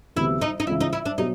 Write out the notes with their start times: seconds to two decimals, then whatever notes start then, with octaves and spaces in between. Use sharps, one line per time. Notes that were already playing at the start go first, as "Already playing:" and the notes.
0.16 D2 C3 E3 G3 B3 E4
0.41 D#4
0.60 D#4
0.67 C#2 C#3 E3 E4
0.80 D#4
0.93 E4
1.05 D4
1.18 B2 F#3 D#4